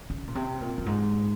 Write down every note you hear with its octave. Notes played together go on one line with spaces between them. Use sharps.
C#3
A#2
C3
A#2
F#2
G#2